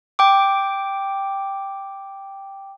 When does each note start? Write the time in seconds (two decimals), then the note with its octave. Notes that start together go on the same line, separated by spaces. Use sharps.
0.19 G5 D6